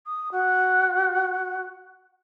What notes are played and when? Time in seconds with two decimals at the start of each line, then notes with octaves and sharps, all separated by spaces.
0.06 D#6
0.31 F#4